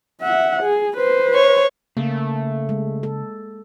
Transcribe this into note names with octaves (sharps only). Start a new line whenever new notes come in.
E5 F#5
G#4
B4 C5
C#5
C#3 A3 A#3 G#4
G#3
A4